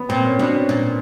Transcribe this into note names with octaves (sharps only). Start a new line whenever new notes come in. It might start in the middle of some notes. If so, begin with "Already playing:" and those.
Already playing: B3
A#2 C4
C#4
B2 D4
C#4
A#2